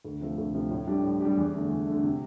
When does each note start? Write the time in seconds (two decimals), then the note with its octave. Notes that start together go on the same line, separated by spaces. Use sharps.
0.05 D2
0.20 C3 F3 A3
0.38 D2
0.54 C3 F3 A3
0.71 A2
0.87 G3 D4 G4
1.04 A2
1.20 G3 D4 G4
1.37 E2
1.53 D3 A3
1.70 E2
1.87 D3 A3
2.03 C3